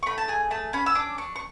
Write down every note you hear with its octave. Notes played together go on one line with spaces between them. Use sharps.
C#6
A3 B5
A5
G#4 G#5
A3 A5
C#4 B5
E6
D4 D6
D4 C#6
C#6